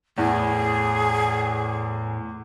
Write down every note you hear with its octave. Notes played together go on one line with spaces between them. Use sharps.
E2 A2 G#4